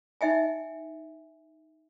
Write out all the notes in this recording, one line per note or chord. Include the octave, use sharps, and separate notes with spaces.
D#4 E5 G5 G#5